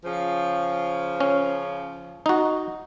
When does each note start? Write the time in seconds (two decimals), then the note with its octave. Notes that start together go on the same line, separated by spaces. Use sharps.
0.05 C#3 F3
1.20 C#4
2.26 D#4 F#4